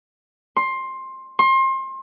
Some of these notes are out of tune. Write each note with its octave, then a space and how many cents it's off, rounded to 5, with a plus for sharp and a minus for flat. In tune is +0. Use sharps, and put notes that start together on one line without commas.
C6 +15
C6 +30